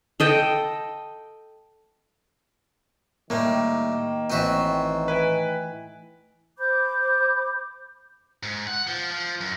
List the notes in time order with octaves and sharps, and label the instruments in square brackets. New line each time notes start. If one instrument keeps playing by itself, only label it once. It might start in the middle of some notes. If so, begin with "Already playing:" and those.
[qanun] A4 D#5 G5
[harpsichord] A2 G3 [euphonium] D#3 [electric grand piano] A#3
[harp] A1 E5 D#7 [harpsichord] C4 F#4
[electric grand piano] B4 [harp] E5 G#5 D7
[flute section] C5 B5 D6 G6
[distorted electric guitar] G#2
F#5
F3
F3
F#2